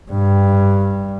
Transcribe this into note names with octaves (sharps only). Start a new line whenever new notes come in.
G2